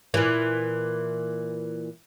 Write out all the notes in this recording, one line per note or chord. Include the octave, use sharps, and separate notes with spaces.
A#2 E3